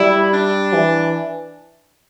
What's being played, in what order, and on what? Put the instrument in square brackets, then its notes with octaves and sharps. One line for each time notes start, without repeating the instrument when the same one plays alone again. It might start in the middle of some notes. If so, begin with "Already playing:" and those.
Already playing: [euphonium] G3 [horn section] E4
[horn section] D4
[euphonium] E3